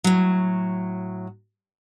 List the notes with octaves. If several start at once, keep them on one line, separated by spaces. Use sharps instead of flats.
A2 F#3